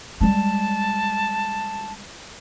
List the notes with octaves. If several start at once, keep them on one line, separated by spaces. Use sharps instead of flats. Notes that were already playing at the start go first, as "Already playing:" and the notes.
G3 G#3 A5